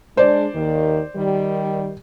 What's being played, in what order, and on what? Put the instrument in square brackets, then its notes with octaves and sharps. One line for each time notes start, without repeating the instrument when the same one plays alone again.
[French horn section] G#3 D4 [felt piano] C5 D5
[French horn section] D#2 D#3
D#3 G3